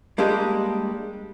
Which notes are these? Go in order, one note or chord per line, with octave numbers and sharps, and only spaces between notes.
G3 G#3 A#3 D4 G4 D#5